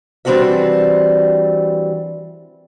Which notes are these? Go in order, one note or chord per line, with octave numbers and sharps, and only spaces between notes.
E3 G3 C4 D4 F#4 E5